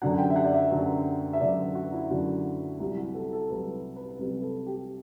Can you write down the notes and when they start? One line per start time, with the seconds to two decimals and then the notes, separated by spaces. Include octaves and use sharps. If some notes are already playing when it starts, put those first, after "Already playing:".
0.02 F#2 D3 F#3 F#5
0.18 G5
0.30 E5
0.36 F#5
0.45 D5
0.54 E5
0.71 F#2 D3 F#3
1.33 E5
1.41 F#2 D3 F#3 D5
1.75 F#4
1.93 E4
2.10 F#2 D3 F#3 F#4
2.80 C2 C3 F#3 E4
2.97 F#4
3.15 A4
3.33 A4
3.50 C2 C3 F#3 B4
3.96 B4
4.19 C2 C3 F#3 B4
4.42 A4
4.66 G4